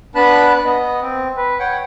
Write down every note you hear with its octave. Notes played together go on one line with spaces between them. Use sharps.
B3 D4 B4 A5 B5 F#6
B3 D#5
C4
B4
C#5 F#5 G5